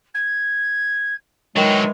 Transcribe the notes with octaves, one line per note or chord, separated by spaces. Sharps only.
G#6
D#3 E3 F#3 G#3 D#4 G5